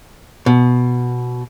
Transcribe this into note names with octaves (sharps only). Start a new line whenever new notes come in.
B2